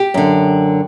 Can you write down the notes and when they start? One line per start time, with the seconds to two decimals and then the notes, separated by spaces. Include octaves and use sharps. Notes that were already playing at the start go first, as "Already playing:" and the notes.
Already playing: G4
0.14 F#2 D3